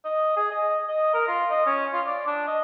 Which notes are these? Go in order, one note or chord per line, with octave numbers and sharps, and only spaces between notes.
D#5
G#4
D#5
D#5
A#4
F4
D#5
C#4
F4
D5
D4
D#5